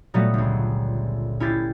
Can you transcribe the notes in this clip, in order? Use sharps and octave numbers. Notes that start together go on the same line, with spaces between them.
A#2 F#3 G3 A3 B3 F#4
G1 C#2
C#4 E4 G4 A6 C7